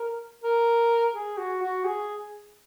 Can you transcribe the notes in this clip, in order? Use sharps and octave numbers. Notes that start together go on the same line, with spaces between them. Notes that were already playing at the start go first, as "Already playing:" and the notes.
Already playing: A#4
A#4
G#4
F#4
F#4
G#4